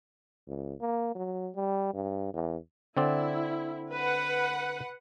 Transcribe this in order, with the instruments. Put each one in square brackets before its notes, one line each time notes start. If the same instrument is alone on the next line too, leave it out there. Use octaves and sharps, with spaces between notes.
[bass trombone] C#2
A#3
F#3
G3
G2
E2
[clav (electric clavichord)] D3 C4 D5 [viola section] E4
[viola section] B4 F#5